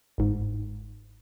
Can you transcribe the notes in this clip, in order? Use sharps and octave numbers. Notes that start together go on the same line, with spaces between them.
G1 G#2